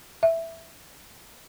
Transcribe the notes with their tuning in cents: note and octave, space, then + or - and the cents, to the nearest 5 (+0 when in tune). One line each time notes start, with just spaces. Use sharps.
E5 +0